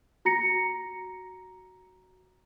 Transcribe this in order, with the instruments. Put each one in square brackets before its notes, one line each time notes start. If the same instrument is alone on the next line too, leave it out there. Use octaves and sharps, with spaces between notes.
[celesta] F#4 A#5 A#6 C#7